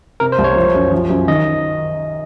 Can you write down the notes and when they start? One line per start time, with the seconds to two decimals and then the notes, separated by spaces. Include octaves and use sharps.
0.20 C3 A#4
0.32 C5
0.38 C2
0.44 C#5
0.56 F3
0.74 F#2
0.92 F3
1.10 F#2
1.28 D#3 D#5